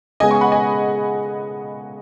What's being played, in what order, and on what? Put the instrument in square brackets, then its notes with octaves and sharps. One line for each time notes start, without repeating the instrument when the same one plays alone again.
[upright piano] C#3 G#3 B3 [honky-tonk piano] D#5 G#5
[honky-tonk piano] G#5 C#6
F#5 B5
D#5 G#5